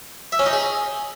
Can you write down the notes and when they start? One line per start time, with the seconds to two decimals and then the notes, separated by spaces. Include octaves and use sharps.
0.32 E5
0.39 C#4
0.46 D#4
0.53 G#4